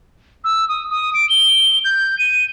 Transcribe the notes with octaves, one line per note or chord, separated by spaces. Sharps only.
E6
D#6
D#6
D7
G7
G6
D#7